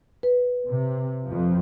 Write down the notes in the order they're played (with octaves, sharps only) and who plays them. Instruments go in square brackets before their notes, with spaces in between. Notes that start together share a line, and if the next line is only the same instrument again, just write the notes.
[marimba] B4
[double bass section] C3
F2 F3